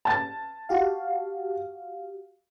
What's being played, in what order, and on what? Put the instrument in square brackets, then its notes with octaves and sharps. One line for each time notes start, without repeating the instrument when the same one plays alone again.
[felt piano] A5 A6
[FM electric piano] F#4 G4 F5